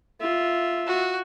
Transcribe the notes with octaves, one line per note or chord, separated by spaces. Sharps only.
F4 E5
F#4